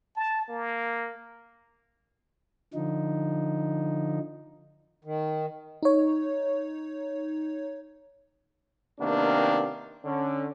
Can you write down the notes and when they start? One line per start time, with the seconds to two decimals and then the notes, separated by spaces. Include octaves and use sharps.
0.16 A5
0.48 A#3
2.74 D3 F3 D#4
5.05 D#3
5.83 D#4 C#5
9.01 C3 D#3 A#3 B3 D4
10.05 D3 C#4